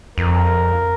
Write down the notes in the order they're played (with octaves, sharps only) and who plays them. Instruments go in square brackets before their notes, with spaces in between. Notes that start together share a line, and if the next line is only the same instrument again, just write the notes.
[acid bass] F2 [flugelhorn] A#4